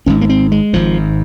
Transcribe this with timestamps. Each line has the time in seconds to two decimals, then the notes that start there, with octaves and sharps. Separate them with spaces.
0.06 G#1 G#2 C#4
0.21 A#3
0.29 C4
0.52 G#3
0.73 G#1 G#2 F3